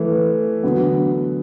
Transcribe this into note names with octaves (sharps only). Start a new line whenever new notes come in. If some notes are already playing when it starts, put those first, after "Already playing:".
Already playing: E3 A3 E4
D3 F#3 B3